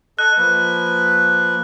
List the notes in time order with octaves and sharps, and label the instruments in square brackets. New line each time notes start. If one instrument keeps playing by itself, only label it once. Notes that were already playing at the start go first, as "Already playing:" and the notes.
[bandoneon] A4 D#5 [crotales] F#6
[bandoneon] F3 A#3 B4